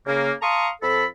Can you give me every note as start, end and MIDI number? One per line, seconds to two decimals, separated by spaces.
0.06 0.32 49
0.06 0.32 58
0.42 0.69 77
0.42 0.69 81
0.42 0.69 82
0.42 0.69 84
0.42 0.69 85
0.42 0.69 87
0.82 1.06 41
0.82 1.06 69
0.82 1.06 83